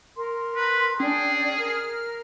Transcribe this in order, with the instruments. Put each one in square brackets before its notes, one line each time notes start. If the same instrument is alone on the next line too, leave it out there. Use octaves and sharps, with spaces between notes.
[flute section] A#4 C6
[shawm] B4
[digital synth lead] C#4 [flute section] D4 D5 G5 [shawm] G#4
[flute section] A#4 [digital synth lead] F6